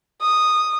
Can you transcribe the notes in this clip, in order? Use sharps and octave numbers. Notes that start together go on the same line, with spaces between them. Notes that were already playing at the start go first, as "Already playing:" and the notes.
D#6